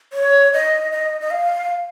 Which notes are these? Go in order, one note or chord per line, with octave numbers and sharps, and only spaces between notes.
C#5
D#5
D#5
D#5
F5